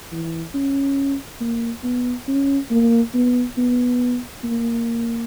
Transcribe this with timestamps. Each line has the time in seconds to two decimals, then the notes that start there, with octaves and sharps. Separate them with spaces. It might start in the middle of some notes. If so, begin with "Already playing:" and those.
0.12 E3
0.54 C#4
1.41 A#3
1.84 B3
2.28 C#4
2.70 A#3
3.14 B3
3.58 B3
4.44 A#3